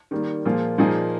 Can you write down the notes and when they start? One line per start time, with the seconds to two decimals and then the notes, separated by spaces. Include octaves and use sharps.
0.11 D#3 G3 A#3
0.45 A#2 F3 A#3 F4 G#4
0.78 A#2 F3 A#3 D#4 G#4